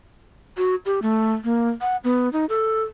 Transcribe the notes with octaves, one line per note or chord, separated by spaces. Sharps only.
F#4
G4
A3
A#3
F#5
B3
D#4
A4